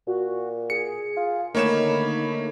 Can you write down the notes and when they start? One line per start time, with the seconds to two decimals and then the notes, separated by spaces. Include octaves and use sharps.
0.07 A#2 F#4
0.70 G#4 C#7
1.17 F4
1.55 D3 D#3 A3 A#3 D#4 C#5 B5 E7